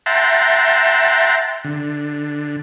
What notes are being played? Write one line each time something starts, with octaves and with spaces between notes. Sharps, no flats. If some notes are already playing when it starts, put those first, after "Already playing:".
E5 F#5 G5 A5 A#5 C6
D3